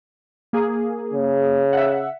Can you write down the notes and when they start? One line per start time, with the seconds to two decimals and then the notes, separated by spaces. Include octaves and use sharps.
0.53 A#3 G#4
1.13 C#3
1.73 E5 F#5